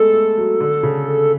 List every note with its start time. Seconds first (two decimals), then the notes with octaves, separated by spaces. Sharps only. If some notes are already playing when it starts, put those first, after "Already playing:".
Already playing: G#3 A3 B3 A4
0.14 A3
0.37 F#3
0.60 D3
0.83 C#3